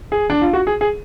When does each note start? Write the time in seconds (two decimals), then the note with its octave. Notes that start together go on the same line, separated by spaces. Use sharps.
0.12 G#4
0.30 D4
0.42 F4
0.53 F#4
0.67 G#4
0.81 G#4